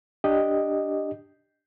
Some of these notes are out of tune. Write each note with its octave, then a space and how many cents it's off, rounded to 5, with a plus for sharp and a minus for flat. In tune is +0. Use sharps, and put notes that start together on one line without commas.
D4 +0 G4 +0 D#5 +0